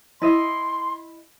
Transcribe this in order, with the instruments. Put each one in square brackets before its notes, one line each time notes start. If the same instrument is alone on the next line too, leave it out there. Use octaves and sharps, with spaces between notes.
[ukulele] E4 D#5 E5 [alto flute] C6